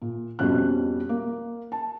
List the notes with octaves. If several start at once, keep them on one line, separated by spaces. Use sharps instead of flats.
A#2
F2 B2 G3 C#4 F#6
A#3
A5